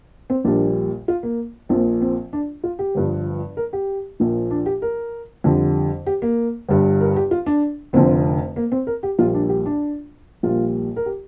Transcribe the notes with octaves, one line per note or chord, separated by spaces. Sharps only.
C4
A#1 A#2 G3 D4
F4
A#3
A#1 A#2 F3 C4
C4
D4
F4
G4
G1 G2 F3
A#4
G4
A#1 A#2 F3
D4
G4
A#4
F2 D3 G3
G4
A#3
G1 G2 G3
A#4
G4
F4
D4
F1 F2 D3 C4
A#3
C4
A#4
G4
A#1 A#2 G3 F4
D4
G4
D4
A#1 A#2 G3 F4
A#4
G4